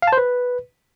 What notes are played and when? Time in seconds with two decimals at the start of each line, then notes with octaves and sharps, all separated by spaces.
0.02 F5
0.07 A5
0.13 C5
0.18 B4